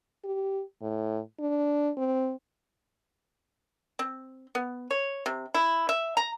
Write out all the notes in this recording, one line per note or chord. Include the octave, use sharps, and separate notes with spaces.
G4
A2
D4
C4
C4
B3
C#5
C3
E4
E5
A#5